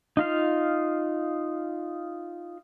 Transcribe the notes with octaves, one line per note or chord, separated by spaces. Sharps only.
D#4 F4 F5